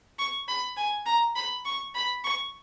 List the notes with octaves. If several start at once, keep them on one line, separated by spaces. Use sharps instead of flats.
C#6
B5
G#5
A#5
B5
C#6
B5
C#6